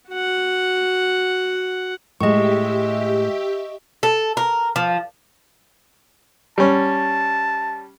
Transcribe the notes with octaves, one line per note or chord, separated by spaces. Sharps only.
F#4 F#5
A2 G#3 G4 D#5 E5 C#6
A4
A#4
F3
G3 C#4 A5